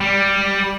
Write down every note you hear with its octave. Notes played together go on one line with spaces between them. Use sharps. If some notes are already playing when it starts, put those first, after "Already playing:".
G3